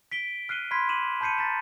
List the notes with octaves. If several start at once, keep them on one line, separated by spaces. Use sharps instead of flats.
B6 D7 G7
F6 F#6 C7 D#7 G7
B5 C6 F6 G#6 B6 C7
D6 D#7 E7 F#7
A5 B5 G6 C7 C#7 D#7
A#5 A6 B6 D#7 E7